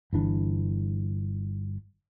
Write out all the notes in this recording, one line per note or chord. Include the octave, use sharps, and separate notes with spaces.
G1 E3 D4